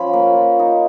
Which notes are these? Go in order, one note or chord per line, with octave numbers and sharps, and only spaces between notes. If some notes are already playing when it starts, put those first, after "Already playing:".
Already playing: F3 C#4 B5
A#3
F3
D#4